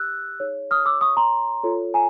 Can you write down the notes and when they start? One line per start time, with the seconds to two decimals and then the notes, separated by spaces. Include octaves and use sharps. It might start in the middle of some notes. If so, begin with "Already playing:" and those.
Already playing: G4 E6 F#6
0.40 D#4 G#4 C#5
0.71 D#6 F6
0.86 D6 E6
1.01 C#6 D#6
1.17 A#5 C6
1.64 F4 A4 C#5
1.94 G#5 A#5